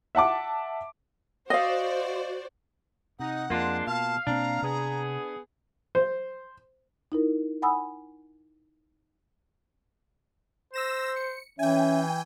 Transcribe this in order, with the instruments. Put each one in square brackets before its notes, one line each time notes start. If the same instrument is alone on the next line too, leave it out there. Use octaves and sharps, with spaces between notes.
[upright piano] E5 F#5 A5 D6
[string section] F#4 C5 D5 [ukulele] D#5 F5
[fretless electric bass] C3 [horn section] D#4 [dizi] F#5
[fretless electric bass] F2 [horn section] G#3 D4 C6 [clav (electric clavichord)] A#3 F4
[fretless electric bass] B2 [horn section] F5 [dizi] A5
[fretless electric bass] B2 A#3 C4 [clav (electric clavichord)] D4 [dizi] A#5
[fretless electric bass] C3 [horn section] B3 G#4
[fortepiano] C5
[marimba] D#4 E4 A#4
F#5 G#5 B5 D#6 E6
[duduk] C5 [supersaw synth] E6 A#6 E7
[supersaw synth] C#7
[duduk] E3 [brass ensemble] C#4 [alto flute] E5 [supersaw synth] G5 G#5